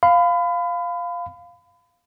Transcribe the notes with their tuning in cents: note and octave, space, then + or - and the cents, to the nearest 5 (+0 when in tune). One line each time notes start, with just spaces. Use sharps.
F5 +0 B5 +30